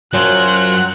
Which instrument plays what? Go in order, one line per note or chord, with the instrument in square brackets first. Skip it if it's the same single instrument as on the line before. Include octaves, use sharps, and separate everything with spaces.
[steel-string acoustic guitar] F#2 [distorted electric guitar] F#3 [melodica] F4 C5 G5 [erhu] F#6